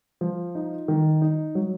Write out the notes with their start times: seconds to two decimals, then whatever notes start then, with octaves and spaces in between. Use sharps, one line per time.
0.21 F3
0.55 D#4
0.88 D#3
1.22 D#4
1.55 F#3